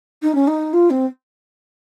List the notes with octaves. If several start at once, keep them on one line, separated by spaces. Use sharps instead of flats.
D#4
C#4
D#4
F4
C4